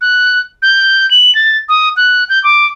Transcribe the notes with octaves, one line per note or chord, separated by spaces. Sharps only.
F#6
G6
F#7
A6
D#6
F#6
G6
D6